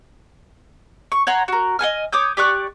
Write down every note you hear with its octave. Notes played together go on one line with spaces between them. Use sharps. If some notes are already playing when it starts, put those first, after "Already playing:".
C#6
C#5 F#5 A#5 C6
F#4 A#4
D#5 F#5 G#5 F6
C#5 D6 D#6 G6
G4 D5 C#6 F#6